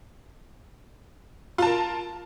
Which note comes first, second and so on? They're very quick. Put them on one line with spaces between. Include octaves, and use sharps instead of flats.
F4 A5 A#4